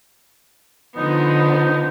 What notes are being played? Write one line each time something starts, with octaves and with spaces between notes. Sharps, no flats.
D3 F3 B3 D#4